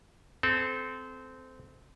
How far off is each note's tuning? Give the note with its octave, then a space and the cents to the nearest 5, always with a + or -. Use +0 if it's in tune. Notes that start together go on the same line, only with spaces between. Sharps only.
C4 -20 A4 -25